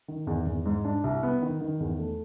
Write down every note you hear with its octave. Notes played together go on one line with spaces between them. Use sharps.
D#3
E2
E2
G#2
D4
C2
B3
D#3
D#3
E2
A3